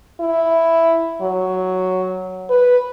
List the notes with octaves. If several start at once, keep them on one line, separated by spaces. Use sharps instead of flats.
E4
F#3
B4